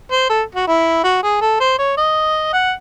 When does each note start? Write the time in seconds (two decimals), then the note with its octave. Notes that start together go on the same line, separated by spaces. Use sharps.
0.11 C5
0.30 A4
0.55 F#4
0.68 E4
1.04 F#4
1.23 G#4
1.42 A4
1.60 C5
1.79 C#5
1.97 D#5
2.53 F#5